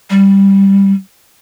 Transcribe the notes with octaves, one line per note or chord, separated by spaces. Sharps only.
G3